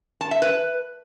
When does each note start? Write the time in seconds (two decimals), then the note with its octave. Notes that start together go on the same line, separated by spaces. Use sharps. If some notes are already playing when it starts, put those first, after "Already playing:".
0.21 A5
0.31 E5
0.42 B4